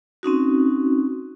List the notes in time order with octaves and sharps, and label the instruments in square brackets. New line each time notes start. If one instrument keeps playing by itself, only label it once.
[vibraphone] C4 C#4 D#4 F#4